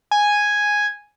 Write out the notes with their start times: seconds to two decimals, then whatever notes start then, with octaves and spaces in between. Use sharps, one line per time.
0.11 G#5